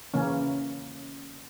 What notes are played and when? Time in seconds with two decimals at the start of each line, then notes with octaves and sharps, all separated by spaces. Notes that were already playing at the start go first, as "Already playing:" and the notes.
0.14 C#3 E3 A#3 C#4